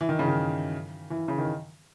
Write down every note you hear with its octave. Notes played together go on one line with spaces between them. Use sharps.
E3
D#3
C#3
D#3
E3
C#3
D#3